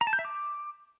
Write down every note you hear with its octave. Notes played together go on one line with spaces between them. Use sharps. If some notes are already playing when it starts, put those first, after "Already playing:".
A#5
A5
G6
E5
D6